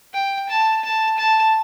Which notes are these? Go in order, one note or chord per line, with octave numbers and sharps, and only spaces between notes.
G5
A5
A5
A5